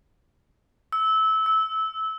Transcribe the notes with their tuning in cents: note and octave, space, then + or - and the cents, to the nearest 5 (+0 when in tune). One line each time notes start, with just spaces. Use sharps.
E6 -20
E6 -15